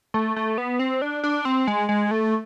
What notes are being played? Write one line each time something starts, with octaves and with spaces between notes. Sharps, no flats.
A3
A3
B3
C4
D4
D4
C4
G#3
G#3
A3